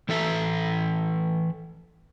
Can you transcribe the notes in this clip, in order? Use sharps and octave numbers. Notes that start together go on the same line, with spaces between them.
E3 A4 E5